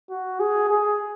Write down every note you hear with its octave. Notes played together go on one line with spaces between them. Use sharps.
F#4
G#4
G#4